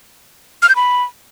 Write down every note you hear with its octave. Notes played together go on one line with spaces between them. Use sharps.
F6
G6
B5